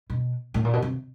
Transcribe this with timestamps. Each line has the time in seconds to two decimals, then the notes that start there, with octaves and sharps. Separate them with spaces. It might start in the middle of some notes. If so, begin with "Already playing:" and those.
0.10 B2
0.54 A2
0.65 A#2
0.73 B2
0.82 C3